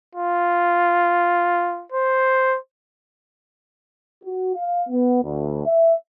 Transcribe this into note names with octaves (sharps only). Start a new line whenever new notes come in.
F4
C5
F#4
F5
B3
D2
E5